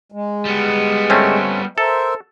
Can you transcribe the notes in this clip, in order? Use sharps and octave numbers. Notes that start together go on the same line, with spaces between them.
G#3
G3 B3
A3 C4 C#4
A4 A#4 C5 E5